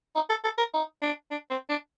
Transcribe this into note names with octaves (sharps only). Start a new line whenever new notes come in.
D#4
A4
A4
A#4
D#4
D4
D4
C4
D4